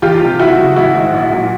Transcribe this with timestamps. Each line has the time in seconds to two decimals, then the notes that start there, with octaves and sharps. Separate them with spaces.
0.02 E2 F4 G4
0.21 C3 F3
0.39 D#2 E4 F#4
0.57 C#3 F#3
0.76 A1 E4 F#4
0.95 G#2 D#3
1.13 A#1
1.31 A#2 F#3